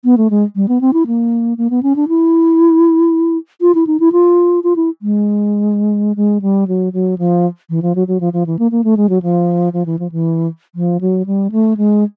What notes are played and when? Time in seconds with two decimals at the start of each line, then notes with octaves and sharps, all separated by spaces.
0.04 B3
0.17 A3
0.30 G#3
0.56 G3
0.68 B3
0.81 C4
0.93 E4
1.07 A#3
1.58 A#3
1.70 B3
1.83 C#4
1.96 D4
2.08 E4
3.61 F4
3.75 E4
3.87 D#4
4.00 E4
4.12 F4
4.64 F4
4.76 E4
5.02 G#3
6.16 G#3
6.42 G3
6.68 F#3
6.93 F#3
7.18 F3
7.70 E3
7.82 F3
7.95 F#3
8.08 F#3
8.20 F3
8.33 F3
8.46 E3
8.59 A#3
8.71 A#3
8.84 A3
8.97 G#3
9.09 F#3
9.22 F3
9.73 F3
9.86 E3
9.99 F3
10.12 E3
10.75 F3
11.01 F#3
11.26 G3
11.52 A3
11.77 G#3